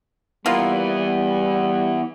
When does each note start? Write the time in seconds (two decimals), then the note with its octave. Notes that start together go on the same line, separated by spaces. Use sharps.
0.46 E3 G3 A#3 B3 E4 F4